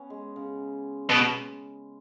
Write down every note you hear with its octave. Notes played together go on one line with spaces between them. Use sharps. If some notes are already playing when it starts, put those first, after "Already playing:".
Already playing: B3 C#4
G#3
C#3
B2